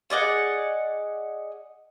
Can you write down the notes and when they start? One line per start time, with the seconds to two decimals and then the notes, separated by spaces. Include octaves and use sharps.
0.10 G#4 D5 D#5 F#5